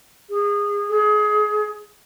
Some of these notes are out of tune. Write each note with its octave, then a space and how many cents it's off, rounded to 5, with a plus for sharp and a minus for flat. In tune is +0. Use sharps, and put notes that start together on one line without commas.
G#4 -25
G#4 +25